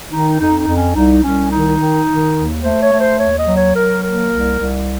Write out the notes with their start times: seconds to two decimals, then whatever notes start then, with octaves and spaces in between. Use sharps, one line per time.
0.11 D#3 D#4
0.39 F2 D#4
0.58 D#4
0.68 F2
0.76 C#4
0.95 C2 D#4
1.23 C2 C#4
1.51 D#3 D#4
1.79 D#3
2.07 D#3
2.35 D#2
2.63 A3 C5
2.82 C#5
2.92 A3
3.00 C5
3.19 D#2 C#5
3.38 D#5
3.47 F#3
3.57 C#5
3.75 F#3 A#4
4.03 A#3 A#4
4.32 C2
4.59 C2